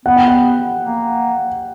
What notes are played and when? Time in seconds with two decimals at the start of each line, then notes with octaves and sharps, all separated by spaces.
0.06 B3 F#5
0.16 G5
0.28 F#5
0.83 A#3